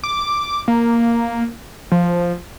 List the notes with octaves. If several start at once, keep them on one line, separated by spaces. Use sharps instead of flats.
D6
A#3
F3